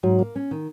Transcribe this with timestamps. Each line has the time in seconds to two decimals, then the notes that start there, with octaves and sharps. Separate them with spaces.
0.03 G#2 F#3
0.19 A#3
0.36 C#4
0.51 D#3